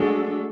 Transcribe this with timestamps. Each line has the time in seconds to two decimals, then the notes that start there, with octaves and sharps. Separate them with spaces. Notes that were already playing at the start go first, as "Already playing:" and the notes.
Already playing: F#3 G#3 A3 D4 F#4 A4